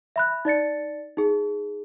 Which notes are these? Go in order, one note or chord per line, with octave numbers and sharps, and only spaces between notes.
E5 B5 F#6
D#4 D5 A6 C#7
D#4 G#4